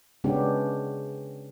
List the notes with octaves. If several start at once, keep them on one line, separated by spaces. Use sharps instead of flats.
C#3 G#3 B3 C#4 D4 G4